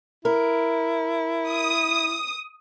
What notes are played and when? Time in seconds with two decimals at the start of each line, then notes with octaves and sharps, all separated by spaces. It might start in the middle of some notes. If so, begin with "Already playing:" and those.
0.25 E4 A#4
1.49 D#6